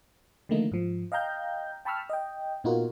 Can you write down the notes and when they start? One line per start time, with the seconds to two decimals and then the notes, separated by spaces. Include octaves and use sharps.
0.49 D3 D#3 F3 A3 A#3 D#4
0.72 G#2 F3
1.12 D#5 F5 G5 A#5 G6
1.85 G5 A5 B5 C#6 E6 F6
2.10 D#5 G5
2.64 A#2 B3 D#4 F4 F#4 A#4